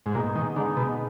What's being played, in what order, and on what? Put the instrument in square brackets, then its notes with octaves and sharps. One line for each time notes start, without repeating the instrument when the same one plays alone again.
[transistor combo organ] G#2
[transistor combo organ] A#2 [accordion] G#3 B3 D#4 G#4
[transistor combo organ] D#3
[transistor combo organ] D3 [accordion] G#3 B3 D#4 G#4
[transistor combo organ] B2